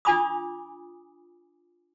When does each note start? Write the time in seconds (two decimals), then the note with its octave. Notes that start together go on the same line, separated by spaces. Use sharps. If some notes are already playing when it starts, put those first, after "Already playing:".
0.05 D4 F4 G#5 B5 D6 D#6